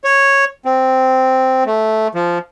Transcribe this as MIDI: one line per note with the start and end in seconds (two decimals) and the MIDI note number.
0.04 0.45 73
0.65 1.64 60
1.66 2.08 57
2.15 2.38 53